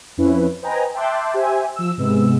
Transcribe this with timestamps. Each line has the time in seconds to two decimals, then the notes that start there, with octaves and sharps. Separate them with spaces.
0.17 F2 F3 C#4 E4 B4
0.62 B4 C5 D#5 G5 G#5 A#5
0.94 E5 G5 A5 C6 D6 F#6
1.34 G4 C5 E5 G#5
1.76 F3 E6
1.97 G#2 C3 G#3 B3 E6